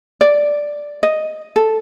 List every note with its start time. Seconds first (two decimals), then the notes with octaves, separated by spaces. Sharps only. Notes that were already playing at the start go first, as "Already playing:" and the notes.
0.21 D5
1.03 D#5
1.56 A4